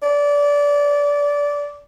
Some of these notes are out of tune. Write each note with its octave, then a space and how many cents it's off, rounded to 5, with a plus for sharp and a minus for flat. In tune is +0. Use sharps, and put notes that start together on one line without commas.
D5 -20